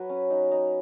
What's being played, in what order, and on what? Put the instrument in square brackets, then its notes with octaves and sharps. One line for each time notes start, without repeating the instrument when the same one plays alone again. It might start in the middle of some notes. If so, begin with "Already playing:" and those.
Already playing: [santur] F#3 B4
C#4
D#4
D#4